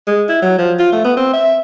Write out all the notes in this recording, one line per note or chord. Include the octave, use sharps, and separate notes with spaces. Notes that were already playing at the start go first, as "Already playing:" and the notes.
G#3
E4
F#3
F3
F4
A3
B3
C4
E5